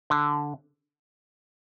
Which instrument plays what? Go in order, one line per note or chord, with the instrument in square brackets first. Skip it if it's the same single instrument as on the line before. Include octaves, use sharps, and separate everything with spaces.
[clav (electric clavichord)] D3